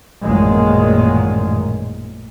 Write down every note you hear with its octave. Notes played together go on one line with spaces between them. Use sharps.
A1 F#2 A#2 D#3 G#3